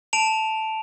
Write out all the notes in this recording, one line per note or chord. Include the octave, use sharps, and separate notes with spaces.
A5 D7 F7